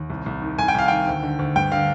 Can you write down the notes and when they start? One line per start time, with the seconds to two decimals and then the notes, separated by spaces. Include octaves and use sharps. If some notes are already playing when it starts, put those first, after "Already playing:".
Already playing: D#2
0.10 C2
0.26 C2
0.42 D#3
0.59 C2 G#5
0.68 G5
0.75 C2 F5
0.88 D#3 G5
1.07 D2
1.23 D3
1.39 D2
1.56 G2 G5
1.72 D3 F5